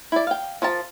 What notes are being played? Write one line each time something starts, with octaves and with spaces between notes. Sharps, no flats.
E4 D5
F5 G5
F3 F4 A#4 A5